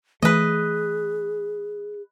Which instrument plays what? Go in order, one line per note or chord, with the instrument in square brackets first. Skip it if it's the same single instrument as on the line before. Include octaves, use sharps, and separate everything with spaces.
[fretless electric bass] E3 A3 [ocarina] G#4 [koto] B4 D#5